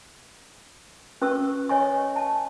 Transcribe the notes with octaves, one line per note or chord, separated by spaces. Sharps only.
C#4 B4 C#6 E6
C#5 D#5 G#5 C#6
A5